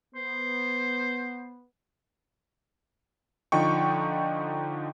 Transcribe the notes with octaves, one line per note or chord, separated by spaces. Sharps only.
B3 C5
D3 F3 D#4 G5 C#6